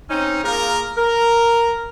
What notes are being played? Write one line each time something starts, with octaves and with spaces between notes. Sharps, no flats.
C4 C#4 D#4
A#3 F4 G#4 A#4
A#4